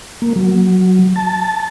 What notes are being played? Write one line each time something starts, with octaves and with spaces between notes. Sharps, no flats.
A#3
F#3
A5